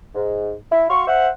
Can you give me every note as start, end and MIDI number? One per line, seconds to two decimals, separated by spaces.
0.15 0.53 44
0.71 0.85 64
0.89 1.06 66
0.89 1.06 77
0.89 1.06 84
0.89 1.06 85
1.07 1.28 72
1.07 1.28 76
1.07 1.28 78